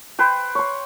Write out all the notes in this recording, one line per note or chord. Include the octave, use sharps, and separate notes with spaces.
B4 C5 G5
C#5 C6